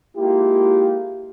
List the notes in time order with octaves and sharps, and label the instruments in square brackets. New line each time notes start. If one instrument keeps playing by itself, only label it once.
[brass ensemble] G#3 A#3 E4 F4 G4